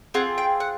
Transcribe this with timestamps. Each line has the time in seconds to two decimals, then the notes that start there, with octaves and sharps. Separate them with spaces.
0.14 C4 F4 G#4 F#5
0.38 G5
0.60 F#5